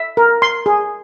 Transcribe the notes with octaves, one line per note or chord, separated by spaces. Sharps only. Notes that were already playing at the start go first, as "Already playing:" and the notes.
Already playing: E5
A#4
C6
G#4